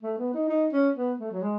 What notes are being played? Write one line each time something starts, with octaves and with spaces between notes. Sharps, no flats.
A3
B3
D#4
D#4
C#4
B3
A3
F#3
G#3